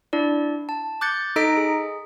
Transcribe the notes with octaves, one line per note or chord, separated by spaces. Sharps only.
D4 E4 D5
A5
D6 F#6 G6 A6 C#7
D#4 A4 D#5 A#5 B6 D7
G#4